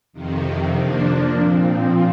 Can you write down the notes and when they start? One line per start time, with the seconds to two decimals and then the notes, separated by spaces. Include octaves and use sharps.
0.13 F2 C3 D#3
0.74 F3 A#3 D4
1.35 A#2 F3 C4